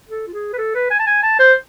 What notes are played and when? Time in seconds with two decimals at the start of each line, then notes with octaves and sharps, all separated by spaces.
0.09 A4
0.27 F4
0.33 G#4
0.53 B4
0.58 A4
0.74 B4
0.90 G#5
0.99 A5
1.07 G#5
1.23 A5
1.39 C5